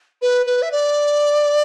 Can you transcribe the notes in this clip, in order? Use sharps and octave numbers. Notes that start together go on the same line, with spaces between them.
B4
B4
E5
D5